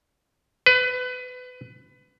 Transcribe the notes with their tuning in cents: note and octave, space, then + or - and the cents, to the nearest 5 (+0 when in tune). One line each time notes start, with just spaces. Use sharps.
B4 +25